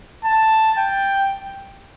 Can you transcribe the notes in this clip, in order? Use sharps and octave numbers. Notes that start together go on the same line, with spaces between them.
A5
G5